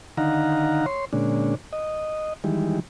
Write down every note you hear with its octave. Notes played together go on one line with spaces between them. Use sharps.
D3 D#3 D#4 F5 F#5 A#5
C#5 C6
A#2 D3 G#3 C#4 D4
D#5
D#3 E3 G3 G#3